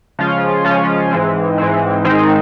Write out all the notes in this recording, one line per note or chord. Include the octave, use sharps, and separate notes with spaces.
C#3 F3 G#3 C#4 F4
C#3 F3 G#3 C#4 F4
G#2 E3 G#3 C4
G#2 E3 G#3 C4
G#2 D#3 G#3 C4 D#4